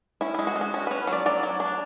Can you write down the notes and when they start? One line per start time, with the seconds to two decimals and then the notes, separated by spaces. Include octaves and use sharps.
0.21 C#4 E4
0.34 G#3 E4
0.47 F#4
0.56 G#3
0.61 F#4
0.74 C#4 F#4
0.87 C#4 B4
1.07 F#3
1.13 D5
1.26 F#3 D5
1.43 F#3
1.60 D4